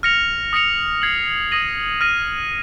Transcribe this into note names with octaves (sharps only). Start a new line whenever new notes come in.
F6 A#6 C#7 F7
D#6 A#6 C#7 F7
G#6 C7 F#7
D#6 A#6 D#7 F#7
F6 A#6 D#7